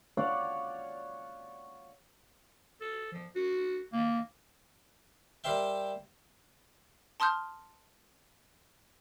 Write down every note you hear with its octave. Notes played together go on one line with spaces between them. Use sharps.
C#5 D5 F5 F#5
A4
F3
F#4
A#3
G3 G4 A#4 C5 E5 G5
A5 C6 D#6 F6 G6